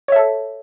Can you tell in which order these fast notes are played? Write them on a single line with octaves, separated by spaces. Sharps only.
C#5 E5 A4